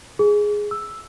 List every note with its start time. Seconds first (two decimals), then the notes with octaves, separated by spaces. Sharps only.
0.19 G#4
0.71 E6